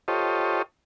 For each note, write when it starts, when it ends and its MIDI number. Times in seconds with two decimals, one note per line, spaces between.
0.08 0.62 65
0.08 0.62 67
0.08 0.62 69
0.08 0.62 72
0.08 0.62 73
0.08 0.62 75